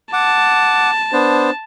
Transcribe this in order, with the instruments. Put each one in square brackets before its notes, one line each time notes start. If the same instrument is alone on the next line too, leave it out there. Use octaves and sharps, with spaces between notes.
[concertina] F#5 D6 [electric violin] A5
[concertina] B3 D4 C5